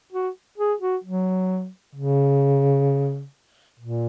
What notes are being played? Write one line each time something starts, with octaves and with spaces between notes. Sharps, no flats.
F#4
G#4
F#4
F#3
C#3
A#2